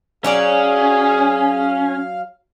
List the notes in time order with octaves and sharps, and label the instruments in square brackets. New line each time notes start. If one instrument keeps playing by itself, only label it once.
[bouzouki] F#3 C#5 D5 [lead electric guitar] C#4 [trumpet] G#4 [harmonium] F5